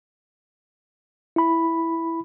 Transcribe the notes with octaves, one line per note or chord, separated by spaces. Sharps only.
E4 B5